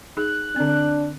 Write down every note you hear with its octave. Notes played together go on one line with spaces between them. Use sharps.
D#4 G#4 F#6
D3 C4 D4